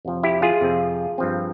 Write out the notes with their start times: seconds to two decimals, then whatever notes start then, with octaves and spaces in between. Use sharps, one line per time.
0.05 F2 C3 F3 C4
0.23 E4 G4
0.42 F4 G#4
0.61 F2 C3 F3 C4
1.18 G2 F3 C4